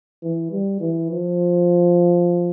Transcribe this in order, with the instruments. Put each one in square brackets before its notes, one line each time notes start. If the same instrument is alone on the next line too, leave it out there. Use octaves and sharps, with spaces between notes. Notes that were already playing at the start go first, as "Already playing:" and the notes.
[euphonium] E3
G3
E3
F3